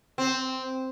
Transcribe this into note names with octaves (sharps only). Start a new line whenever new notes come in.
C4